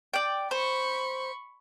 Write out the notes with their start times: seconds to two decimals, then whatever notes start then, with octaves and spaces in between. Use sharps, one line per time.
0.14 D5 G5
0.51 C5 B5 C#6